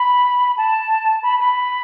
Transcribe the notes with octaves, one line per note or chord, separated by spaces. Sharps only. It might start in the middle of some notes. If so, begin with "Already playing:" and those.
Already playing: B5
A5
B5
B5